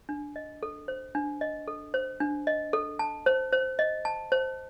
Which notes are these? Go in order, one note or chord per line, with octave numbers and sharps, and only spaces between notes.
D4
D#5
A4
C5
D4
D#5
A4
C5
D4
D#5
A4
A5
C5
C5
D#5
A5
C5